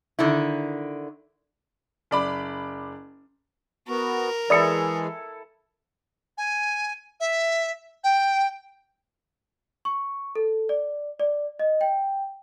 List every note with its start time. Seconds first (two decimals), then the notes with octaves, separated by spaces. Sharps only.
0.19 D3 D#3 E4
2.11 F#1 D5 B5
3.88 B3 F#4 A#4
4.50 E3 G#3 E4 G#4 A4 D5 D#6 C#7
6.37 G#5
7.20 E5
8.04 G5
9.85 C#6
10.36 A4
10.69 D5
11.20 D5
11.59 D#5
11.81 G5